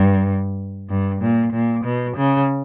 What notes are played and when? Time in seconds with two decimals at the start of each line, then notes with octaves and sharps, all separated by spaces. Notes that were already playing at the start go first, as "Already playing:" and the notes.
Already playing: G2
0.89 G2
1.21 A#2
1.53 A#2
1.84 B2
2.17 C#3